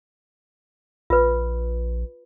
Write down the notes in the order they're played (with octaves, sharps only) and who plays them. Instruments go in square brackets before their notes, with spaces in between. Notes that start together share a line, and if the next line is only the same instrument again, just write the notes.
[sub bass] A#1 [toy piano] F4 B4